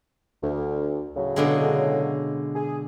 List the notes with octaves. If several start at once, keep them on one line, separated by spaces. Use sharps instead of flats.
D2
A2 C#3 F#3
B2 D3 G#3
G#4